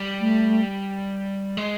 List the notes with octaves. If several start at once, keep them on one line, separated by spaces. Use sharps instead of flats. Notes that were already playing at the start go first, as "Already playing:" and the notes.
Already playing: G3
A3
G#3